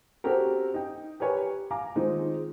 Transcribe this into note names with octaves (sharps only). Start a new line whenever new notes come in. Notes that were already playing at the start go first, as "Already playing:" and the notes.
C4 C#4 F#4 G4 A4 A#4
D#4 G5
G4 A#4 B4 C#5 G#5
F5 G#5 A#5 D6
D#3 G#3 C4 D#4 F4 G#4